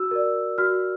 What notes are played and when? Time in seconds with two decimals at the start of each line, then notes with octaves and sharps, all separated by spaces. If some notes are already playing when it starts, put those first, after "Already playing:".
Already playing: F#4 E6
0.11 A#4 D5
0.58 F#4 F6